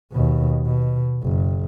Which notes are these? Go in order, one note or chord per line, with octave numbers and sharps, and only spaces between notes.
D#2 B2
B2
F#1